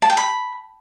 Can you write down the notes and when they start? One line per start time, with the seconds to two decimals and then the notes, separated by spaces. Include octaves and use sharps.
0.02 A5
0.10 G5
0.17 B5